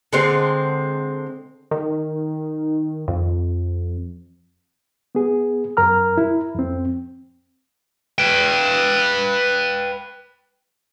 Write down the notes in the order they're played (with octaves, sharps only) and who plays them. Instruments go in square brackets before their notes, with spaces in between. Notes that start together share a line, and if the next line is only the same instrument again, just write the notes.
[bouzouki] D3 G#3 C4
[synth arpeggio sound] D#3
F2
[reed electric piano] B3 G#4
F#2 A#4 A#5 F6
E4
F2 C4
[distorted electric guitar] B4 G5